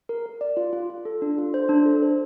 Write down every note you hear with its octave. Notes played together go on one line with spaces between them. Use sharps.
A#4
A#4
D5
F4
F4
F4
A4
D4
F4
C5
D4
A4
C5